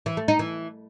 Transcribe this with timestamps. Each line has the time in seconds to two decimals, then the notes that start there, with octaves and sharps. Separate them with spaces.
0.06 E3
0.17 A3
0.28 D#4
0.39 E3